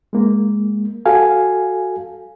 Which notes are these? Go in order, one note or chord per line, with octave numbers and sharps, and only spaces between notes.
G#3 A#3
F#4 A4 F5 G#5